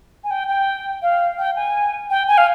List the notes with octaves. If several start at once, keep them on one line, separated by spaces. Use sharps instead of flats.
G#5
G5
G5
F5
G5
G#5
G5
G#5
F5